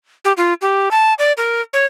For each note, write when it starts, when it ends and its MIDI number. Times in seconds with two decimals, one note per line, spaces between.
0.25 0.33 67
0.37 0.53 65
0.61 0.89 67
0.91 1.13 81
1.19 1.32 74
1.37 1.61 70
1.73 1.86 73